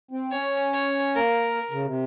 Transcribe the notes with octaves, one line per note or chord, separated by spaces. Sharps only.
C4
C#4 C#5
C#5
A#3 A#4
C#3
C3